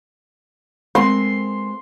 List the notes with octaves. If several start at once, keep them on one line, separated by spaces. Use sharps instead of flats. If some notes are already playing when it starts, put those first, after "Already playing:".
G#3 C4 A#4 C6